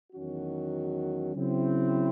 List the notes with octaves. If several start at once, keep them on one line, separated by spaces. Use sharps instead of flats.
E2 D#3 F#3 C#4 F#4
C#3 F#3 C4 E4